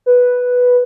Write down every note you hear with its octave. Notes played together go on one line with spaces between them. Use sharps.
B4